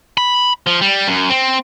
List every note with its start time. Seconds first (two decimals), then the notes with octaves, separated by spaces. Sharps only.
0.17 B5
0.67 F3
0.81 G3
1.08 F#2
1.30 C4